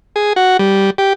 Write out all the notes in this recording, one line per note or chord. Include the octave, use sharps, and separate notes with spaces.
G#4
F#4
G3
G4